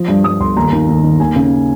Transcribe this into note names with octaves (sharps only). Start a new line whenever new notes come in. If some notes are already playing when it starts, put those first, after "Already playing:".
Already playing: F3 D#6
G2
G2 D#6
G1 C6
D#2 A#5
D#3
D#2
D#3
D#2 G#5
C#3